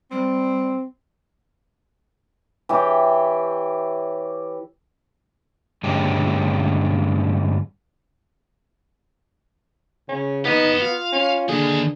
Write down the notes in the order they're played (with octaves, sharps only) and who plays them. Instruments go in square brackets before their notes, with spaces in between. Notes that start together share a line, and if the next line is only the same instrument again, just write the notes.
[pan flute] G3 [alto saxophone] C4
[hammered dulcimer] E3 G4 C#5 G5
[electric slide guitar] G2 D3 G#3 A#3 C#4 G4
[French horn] C#3 [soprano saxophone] C#4
[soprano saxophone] B3 [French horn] D#4 [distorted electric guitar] G4 D#5
[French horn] F4 [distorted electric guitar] F5
[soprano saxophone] C#4
[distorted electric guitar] D#2 D#3 [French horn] D3 [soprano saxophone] G#4